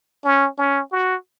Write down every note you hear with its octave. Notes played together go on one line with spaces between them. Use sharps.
C#4
C#4
F#4